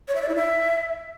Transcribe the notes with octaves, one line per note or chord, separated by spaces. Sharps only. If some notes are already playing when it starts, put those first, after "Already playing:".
C#5
E5
D5
E4
E5